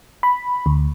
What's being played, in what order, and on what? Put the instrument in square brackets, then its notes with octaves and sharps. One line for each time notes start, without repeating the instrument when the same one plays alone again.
[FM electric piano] B5
D2